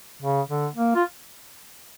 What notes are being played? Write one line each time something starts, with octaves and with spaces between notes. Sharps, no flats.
C#3
D3
A#3
F4